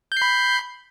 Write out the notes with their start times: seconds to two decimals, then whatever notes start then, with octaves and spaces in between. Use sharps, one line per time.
0.12 G6
0.17 C7
0.22 B5